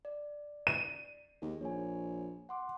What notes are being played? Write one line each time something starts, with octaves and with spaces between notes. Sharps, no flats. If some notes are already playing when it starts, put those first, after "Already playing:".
D5
D#7
D#2 G#4
A#1 C#5 G#5
F#5 C6 D6